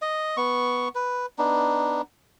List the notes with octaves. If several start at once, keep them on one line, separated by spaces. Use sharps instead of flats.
D#5
B3 C#6
B4
B3 D4 D#4